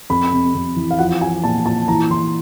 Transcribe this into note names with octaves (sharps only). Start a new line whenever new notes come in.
F2 B5
C3
F2
E3
F5
F3 F#5
F3 G#5
A#2 A5
A#2 A5
E3 A#5
E3 C6